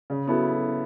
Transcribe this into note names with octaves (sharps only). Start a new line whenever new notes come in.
C#3
F#3 B3 E4 A4